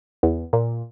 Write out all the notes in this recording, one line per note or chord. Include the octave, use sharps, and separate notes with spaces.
E2
A#2